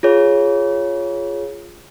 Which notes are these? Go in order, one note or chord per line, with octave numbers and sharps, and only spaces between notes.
F4 G#4 C#5